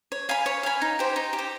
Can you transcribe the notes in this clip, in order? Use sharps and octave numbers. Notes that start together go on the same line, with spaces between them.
C#5
F5 G#5 B5
C#5
F5 G#5 B5
D#4
G4 C5
D#4
G4
C5